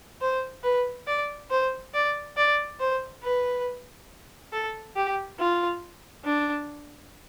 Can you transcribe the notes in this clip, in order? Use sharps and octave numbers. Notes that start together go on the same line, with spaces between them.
C5
B4
D5
C5
D5
D5
C5
B4
A4
G4
F4
D4